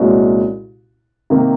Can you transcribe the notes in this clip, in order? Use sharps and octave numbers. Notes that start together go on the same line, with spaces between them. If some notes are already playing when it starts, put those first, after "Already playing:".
Already playing: C2 A#2 G#3 C#4 F#4
C3 D#3 A#3